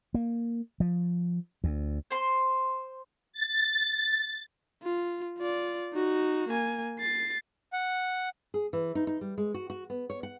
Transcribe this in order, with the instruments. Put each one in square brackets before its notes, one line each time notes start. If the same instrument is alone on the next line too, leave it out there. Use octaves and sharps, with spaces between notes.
[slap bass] A#3
F3
D2
[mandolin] C5 C6
[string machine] A6
[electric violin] F4
F4 D5
D#4 F#4
A#3 G#5
A6 C7
[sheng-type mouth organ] F#5
[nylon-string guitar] G#4
E3
D#4
D#4
G3
G#3
F#4
F#4
B3
C#5
F#5